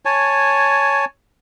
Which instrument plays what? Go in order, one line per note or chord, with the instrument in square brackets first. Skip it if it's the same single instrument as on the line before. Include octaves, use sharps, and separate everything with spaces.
[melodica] C#5 G#5 A5